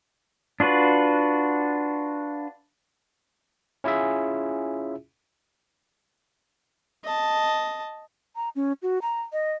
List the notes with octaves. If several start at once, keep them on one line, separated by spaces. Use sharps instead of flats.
D4 F4 F#4 B4
C#4 E4 F4 G#4 E5
D#5 A5
A#5
C#4
F#4
A#5
D#5